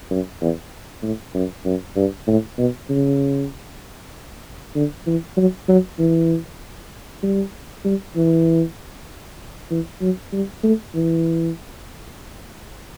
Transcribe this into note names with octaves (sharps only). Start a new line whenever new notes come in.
F#2
E2
A2
F#2
F#2
G2
A2
B2
C#3
D3
E3
F#3
F#3
E3
G3
G3
E3
E3
F#3
G3
A3
E3